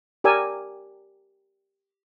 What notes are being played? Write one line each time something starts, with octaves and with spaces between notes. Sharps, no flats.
G4 A#4 D5 G#5 E6